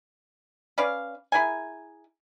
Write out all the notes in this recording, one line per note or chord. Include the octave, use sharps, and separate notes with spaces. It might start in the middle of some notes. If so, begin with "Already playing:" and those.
C#4 B4 D5 F5
E4 G#4 A#4 G#5